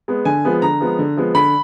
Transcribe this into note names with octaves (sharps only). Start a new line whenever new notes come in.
G#3 B3
D3 G#5
F3 G#3 B3
D3 A#5
F3 G#3 B3
D3
F3 G#3 B3
D3 B5